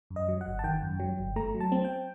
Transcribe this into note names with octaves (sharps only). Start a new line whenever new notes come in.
F#2
D#5
F#3
F#5
G1
A5
D#3 G5
F#2
F#3
G1
A3 A#5
F#3
A5
C4
G5